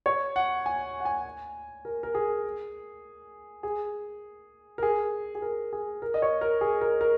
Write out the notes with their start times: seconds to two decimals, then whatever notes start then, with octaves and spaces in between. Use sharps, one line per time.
0.06 C#5
0.36 F#5
0.66 G#5
1.00 F#5
1.05 G#5
1.85 A#4
2.03 A#4
2.15 G#4
3.63 G#4
4.78 A#4
4.83 G#4
5.35 G#4
5.42 A#4
5.73 G#4
6.02 A#4
6.14 D#5
6.22 C#5
6.41 A#4
6.61 G#4
6.81 A#4
7.01 A#4